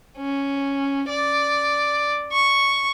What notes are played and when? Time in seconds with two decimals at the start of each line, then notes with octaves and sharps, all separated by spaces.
0.17 C#4
1.09 D5
2.32 C#6